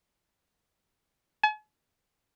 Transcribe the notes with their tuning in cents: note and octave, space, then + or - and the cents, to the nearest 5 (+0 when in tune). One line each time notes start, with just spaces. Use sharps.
G#5 +45